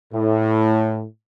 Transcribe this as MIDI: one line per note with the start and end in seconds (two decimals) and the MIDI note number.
0.13 1.04 45